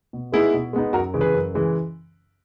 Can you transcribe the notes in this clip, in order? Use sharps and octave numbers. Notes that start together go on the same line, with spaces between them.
B2
G#3 B3 D#4 E4 G#4
B2
G#3 B3 D#4
F#2 F#4 A#4
C#3 E3 G#3
G#4 B4
F#2
C#3 E3 G#3